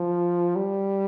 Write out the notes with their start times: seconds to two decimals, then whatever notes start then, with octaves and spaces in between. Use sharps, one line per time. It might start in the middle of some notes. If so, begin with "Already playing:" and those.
Already playing: F3
0.56 G3